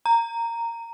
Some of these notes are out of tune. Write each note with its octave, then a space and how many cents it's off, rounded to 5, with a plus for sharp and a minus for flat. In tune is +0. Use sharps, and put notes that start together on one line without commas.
A#5 -10